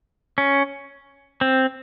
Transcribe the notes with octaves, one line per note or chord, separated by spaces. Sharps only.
C#4
C4